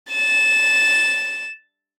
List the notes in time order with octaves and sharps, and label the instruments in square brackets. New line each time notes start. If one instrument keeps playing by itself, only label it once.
[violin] A6 E7